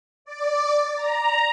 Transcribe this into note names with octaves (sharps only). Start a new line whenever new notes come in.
D5
A#5